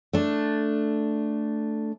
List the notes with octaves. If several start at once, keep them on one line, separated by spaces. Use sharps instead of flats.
A3 D4